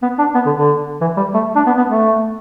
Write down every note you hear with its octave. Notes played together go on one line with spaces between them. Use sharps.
B3
D4
B3
D3
D3
E3
G3
A3
D4
B3
B3
A3